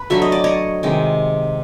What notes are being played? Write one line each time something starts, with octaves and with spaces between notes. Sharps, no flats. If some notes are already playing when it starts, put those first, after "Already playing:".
Already playing: B4
D3 F#3 A3 E5
D#5
D5
C#5 D#5
C3 D#3 G#3